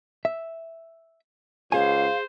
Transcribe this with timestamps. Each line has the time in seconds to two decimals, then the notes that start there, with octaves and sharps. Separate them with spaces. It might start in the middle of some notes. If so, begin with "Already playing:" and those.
0.25 E5
1.72 C#2 G#4 C5 F5 G#5